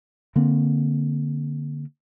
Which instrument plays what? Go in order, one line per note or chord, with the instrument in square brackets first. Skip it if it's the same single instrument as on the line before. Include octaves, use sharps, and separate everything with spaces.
[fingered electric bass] D3 A#3 C4